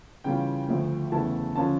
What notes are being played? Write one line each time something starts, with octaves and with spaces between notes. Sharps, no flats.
C#3 E3 G3 C#4 F4 G5
D2 D3 F3 A3
E2 C#3 E3 A3 E4 A5
D3 F3 C#4 F4 A5